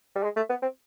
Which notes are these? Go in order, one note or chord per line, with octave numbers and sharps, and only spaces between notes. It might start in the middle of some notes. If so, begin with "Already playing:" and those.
G3
G#3
A3
B3
C4